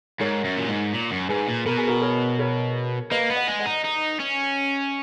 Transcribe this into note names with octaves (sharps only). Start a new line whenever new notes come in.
G#2 A#4 C#5
F#2
A#2
G#2
A#2
F#2
G#2 G#4 B4
A#2
B2 A#4
G#4
F#4 A#4
A#4 C#5
A#4 C#5
A#3 B4 D#5
B3
D#5 F#5
G#3
D#5 F#5
D#4
D#4
C#4